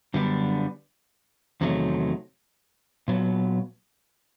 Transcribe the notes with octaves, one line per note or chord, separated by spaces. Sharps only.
F#2 D3 G3 B3 D4
E2 C3 D#3 F#3 A3
A#2 F#3 B3